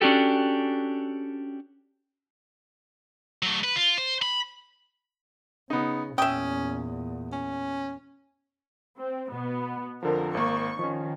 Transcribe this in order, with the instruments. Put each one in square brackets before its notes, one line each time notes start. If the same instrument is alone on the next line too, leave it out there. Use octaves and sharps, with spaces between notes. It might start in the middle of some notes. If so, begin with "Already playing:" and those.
[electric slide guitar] C#4 D4 F#4 G4 A4
[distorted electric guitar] F#3 A3
B4
F4
C5
B5
[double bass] C#3 [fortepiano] B3 D#4
[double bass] E2 A#2 [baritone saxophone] C#4 [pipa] E5 G5 [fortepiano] D#6
[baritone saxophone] C#4
[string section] C4
B2 B3
[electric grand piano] F2 D3 F3 [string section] A#4
[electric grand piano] G#1 A#3 [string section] C#6
[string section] D#3 [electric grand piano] F3 C#4